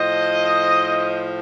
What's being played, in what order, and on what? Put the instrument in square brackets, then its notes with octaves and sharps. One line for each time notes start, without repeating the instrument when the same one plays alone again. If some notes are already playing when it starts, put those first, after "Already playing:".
Already playing: [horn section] A2 F3 C5 D#5